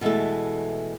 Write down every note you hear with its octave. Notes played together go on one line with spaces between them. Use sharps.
B2 E3 G#3 A3 A4